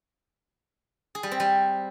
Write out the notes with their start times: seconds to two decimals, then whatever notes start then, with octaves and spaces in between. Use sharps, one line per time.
1.15 G#4
1.23 G3
1.31 C4
1.40 G3